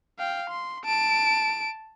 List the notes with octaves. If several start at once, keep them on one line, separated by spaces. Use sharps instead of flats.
F5 G5
C6
A5 D7